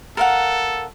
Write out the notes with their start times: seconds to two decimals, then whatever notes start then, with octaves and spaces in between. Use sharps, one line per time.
0.17 A4 A#4 F5 F#5